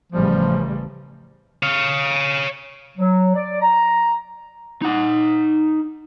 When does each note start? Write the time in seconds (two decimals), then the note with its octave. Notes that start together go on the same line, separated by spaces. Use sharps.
0.12 A1 C#3 F3 G3
1.63 C#5 F5
2.98 F#3
3.36 D5
3.62 A#5
4.82 D#4 F#5